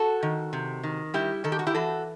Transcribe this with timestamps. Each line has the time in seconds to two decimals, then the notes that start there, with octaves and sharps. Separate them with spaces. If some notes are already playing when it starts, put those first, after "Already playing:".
Already playing: F#4 A4
0.23 D#3
0.53 C3
0.83 D#3
1.14 G3 E4 G4
1.44 D#3 A4
1.52 G4
1.59 F#4
1.67 E4 G4
1.75 E3 F#4 A4